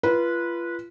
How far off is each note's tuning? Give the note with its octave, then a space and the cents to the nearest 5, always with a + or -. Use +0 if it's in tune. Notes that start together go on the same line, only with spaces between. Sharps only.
F4 -30 B4 -20